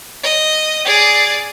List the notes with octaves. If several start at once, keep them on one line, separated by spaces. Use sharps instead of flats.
D#5
G#4 D5